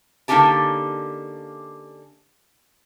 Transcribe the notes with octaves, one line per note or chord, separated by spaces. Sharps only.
D3 A#3 C#4 D#4 G4 A5